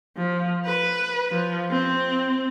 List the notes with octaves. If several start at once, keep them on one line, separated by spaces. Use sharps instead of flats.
F3
B4
F3
C4